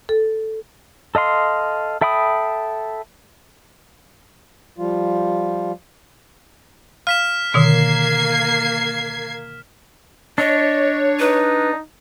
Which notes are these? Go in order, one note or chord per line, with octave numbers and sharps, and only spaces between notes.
A4
A4 D#5 F5 C6
A4 E5 G5 B5 D#6
F3 G3 F4
F5 F6 B6 E7
B2 D3 D#3 A#3 G#6 C7
D4 C#5 D#5
D#4 B4